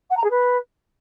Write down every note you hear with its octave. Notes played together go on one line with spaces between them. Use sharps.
F#5
A#5
G#4
B4